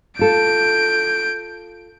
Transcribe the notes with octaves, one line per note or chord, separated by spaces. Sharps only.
F4 A4 G6 D7